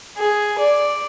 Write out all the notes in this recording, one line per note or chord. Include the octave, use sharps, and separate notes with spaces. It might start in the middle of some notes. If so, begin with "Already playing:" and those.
G#4
D5